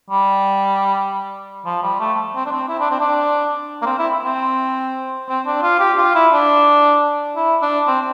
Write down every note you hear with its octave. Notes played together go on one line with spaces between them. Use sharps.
G3
F3
G3
A3
C4
D4
C4
E4
D4
C4
D4
A#3
C4
E4
C4
C4
D4
F4
G4
F4
E4
D4
E4
D4
C4